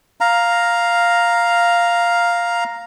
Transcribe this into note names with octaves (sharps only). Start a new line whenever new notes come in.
F5 A#5